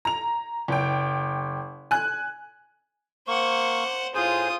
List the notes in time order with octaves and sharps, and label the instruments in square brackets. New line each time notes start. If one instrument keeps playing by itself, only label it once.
[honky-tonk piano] A#5 F7
F#1 G5
G#5 F#6
[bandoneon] A#3 C#6 [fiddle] C5 F#5
[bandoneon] A2 G#4 C5 [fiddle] F4 D#6